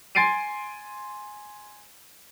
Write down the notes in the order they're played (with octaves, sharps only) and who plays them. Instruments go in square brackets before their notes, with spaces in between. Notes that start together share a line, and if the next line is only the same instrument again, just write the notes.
[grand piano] G#5 C6 A6 C7 D7 D#7